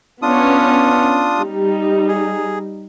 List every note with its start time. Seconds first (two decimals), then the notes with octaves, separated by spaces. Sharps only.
0.22 B3 C#4 D4 F4 D#6
1.39 G3 D#4
2.08 G#4